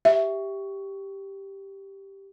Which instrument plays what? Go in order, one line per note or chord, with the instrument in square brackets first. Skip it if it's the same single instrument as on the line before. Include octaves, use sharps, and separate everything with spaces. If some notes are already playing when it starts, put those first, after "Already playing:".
[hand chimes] G4 [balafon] E5